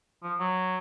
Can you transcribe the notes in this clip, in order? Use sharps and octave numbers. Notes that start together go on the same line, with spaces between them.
F3
F#3